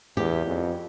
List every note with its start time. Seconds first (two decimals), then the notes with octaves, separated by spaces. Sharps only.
0.17 E2 G4
0.46 F2